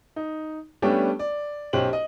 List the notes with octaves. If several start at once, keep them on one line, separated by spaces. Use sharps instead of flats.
D#4
G3 A3 B3 C#4 D4 G4
D5
B1 C#4 G4 C5 F#7
D#5